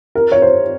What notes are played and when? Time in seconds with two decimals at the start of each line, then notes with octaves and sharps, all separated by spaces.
0.15 A#4
0.32 C#5
0.42 C5